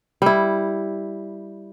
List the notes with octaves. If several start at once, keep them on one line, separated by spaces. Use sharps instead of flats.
G3 E4